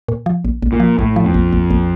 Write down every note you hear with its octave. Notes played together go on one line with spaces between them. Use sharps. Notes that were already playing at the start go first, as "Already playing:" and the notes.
A#2
F3
A#1
A#1
A#2
F3
A#1 A2
F3
F2
A#1
A#1
A#1